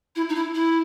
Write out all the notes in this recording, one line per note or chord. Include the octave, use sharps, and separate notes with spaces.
E4
D#4
E4
E4